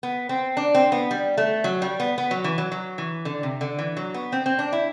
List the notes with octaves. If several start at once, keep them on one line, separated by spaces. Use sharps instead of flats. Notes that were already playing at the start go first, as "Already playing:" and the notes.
B3
C4
D4
C4
B3
G3
A3
F#3
G3
B3
B3
F#3
E3
F#3
F#3
E3
D3
C3
D3
E3
F#3
B3
C4
C4
D4
E4